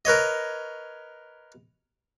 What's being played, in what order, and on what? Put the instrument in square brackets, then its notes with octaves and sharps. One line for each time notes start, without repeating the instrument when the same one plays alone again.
[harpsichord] A#4 B4 C#5 D#5